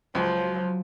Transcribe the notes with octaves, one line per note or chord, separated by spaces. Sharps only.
C#2 F3 F#3